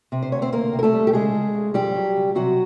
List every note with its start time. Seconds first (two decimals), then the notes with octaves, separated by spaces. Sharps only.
0.12 C3
0.22 C5
0.32 D2 C#5
0.42 C4 C5
0.52 D2 A#3 A#4
0.73 C3
0.79 A#4
0.83 A3 A4
0.93 G3
1.07 G4
1.13 C#3 G#3 G#4
1.35 C#3
1.55 C#3
1.74 F2 G3 G4
1.95 F#3
2.16 C#3
2.35 C3 F#3 F#4